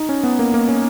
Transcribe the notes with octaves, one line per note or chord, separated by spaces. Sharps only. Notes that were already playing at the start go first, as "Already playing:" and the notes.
Already playing: D#4
C#4
B3
A#3
A#3
C#4